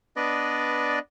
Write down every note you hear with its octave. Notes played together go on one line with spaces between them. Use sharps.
B3 D4 B4 D5 D#5